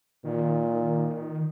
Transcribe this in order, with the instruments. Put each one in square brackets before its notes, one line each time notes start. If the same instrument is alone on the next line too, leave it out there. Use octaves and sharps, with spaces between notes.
[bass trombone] A#2 [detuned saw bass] D#3